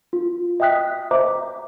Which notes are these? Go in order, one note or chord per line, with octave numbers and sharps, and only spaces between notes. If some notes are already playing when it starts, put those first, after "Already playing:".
F4
D#5 E5 G5 D#6 F#6 B6
C5 D#5 E5 A#5 D6